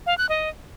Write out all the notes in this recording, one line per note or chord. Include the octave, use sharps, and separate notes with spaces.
F5
F#6
D#5